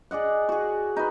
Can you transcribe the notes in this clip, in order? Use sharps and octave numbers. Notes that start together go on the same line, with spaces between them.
G#4 D5 D#5 F#5
F#4 G#4
D#4 F#4 B4